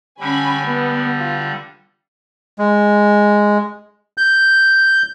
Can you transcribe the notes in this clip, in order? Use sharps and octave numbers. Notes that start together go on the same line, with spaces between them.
D3 G3 C#4 G#5 B5
B3
F4
G#3
G6